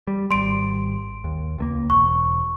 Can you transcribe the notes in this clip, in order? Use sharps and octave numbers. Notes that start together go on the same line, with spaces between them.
G3
G#1 G3 C6 D7
D#2
C#2 A3 A#3
E1 C#6